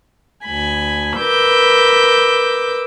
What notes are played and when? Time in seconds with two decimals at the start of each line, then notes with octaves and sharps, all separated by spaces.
0.44 D2 G#5 B5
1.19 A#4 B4 D6 E6 G6